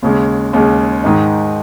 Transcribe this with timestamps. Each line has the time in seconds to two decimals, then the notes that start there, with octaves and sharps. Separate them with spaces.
0.02 D#2 C#3 G#3
0.53 D#2 C#3 G#3
1.04 G#2 D#3 G#3 D#4